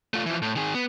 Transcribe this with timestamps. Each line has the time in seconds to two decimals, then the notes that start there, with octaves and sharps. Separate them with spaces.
0.14 A3 F4
0.26 E3 F3
0.42 A2
0.56 D#3 G#4
0.74 B3